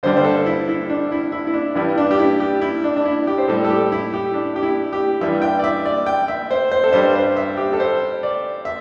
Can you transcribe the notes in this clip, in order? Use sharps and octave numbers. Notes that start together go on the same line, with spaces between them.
G2 D3 G3 C5
C5
A4
E4
E4
D4
E4
E4
E4
D4
G2 E3 G3 E4
D4
G4
E4
G4
E4
D4
D4
E4
G4
C5
A2 G3 A4
A4
G4
E4
G4
D4
G4
E4
G4
G2 E3 G3 E5
G5
D5
E5
D5
G5
E5
C5
C5
A4
G2 G3 C5
C5
E5
G4
A4
C5
D5
E5